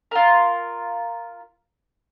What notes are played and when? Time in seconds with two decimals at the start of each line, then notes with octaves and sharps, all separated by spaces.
0.11 F4 A#4